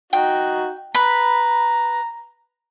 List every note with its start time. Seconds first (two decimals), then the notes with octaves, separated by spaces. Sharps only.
0.13 D#4 F#4 G5
0.95 B4 A#5 B5